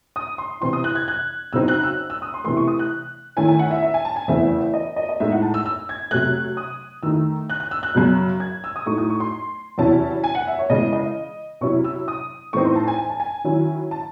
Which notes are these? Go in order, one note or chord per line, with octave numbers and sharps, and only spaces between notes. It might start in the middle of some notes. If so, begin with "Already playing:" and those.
D#6
C6
C3 E3 C4 E4 C6
D#6
F#6
G#6
F#6
C#3 F#3 C4 D#4 E6
F#6
E6
E6
D#6
C6
C3 E3 A3 C6
C#6
D#6
F#6
D#3 A3 C#4 E4 G#5
G#5
F#5
E5
E5
G#5
A5
G#5
E2 C#3 E3 A3 C4 E5
D#5
D#5
D#5
A2 G#3 D#4 E5
F#5
A5
E6
E6
G#6
C3 F#3 A3 F#6
D#6
D#3 A3 D#4 E6
F#6
F#6
E6
F#6
F#2 C#3 F#3
G#6
E6
D#6
A2 F#3 A3 D#4 C#6
D#6
C#6
C6
E2 C3 F#3 C#4 E4 A5
G#5
F#5
E5
C#5
C#3 E3 G#3 D#5
D#5
C3 F#3 C#4 E4 C#6
E6
D#6
A2 E3 C4 D#4 C#6
C6
A5
G#5
G#5
A5
G#5
D#3 F#3 C#4 E4
A5